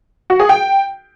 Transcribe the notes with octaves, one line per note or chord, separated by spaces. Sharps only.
F#4
G#4
G5